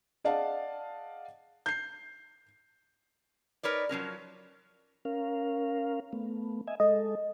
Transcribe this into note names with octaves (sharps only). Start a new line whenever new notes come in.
G#4 D5 D#5 F5 F#5 A5
G6 C7
D#4 A#4 B4 C#5 D5
F3 F#3 C#4 A#4
C#4 A#4 F5
A3 B3
D#5 E5 G#5
G#3 A4 D#5